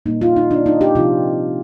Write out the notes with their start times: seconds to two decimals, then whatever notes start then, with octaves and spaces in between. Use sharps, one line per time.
0.06 A#2 G3 A#3 D#4
0.21 F4
0.36 D#4
0.51 D4
0.66 D#4
0.81 G4
0.95 C3 F3 C4 F4